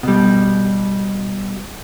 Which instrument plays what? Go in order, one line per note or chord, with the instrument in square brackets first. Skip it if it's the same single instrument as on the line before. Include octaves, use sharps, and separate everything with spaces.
[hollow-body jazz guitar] B2 G3